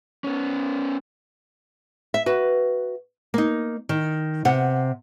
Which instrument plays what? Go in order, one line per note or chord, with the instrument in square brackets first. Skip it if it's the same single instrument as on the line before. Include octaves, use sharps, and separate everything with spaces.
[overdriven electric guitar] B3 C#4
[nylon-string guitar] E5
F#4 B4
A#3 D#4
D#3
C3 F#5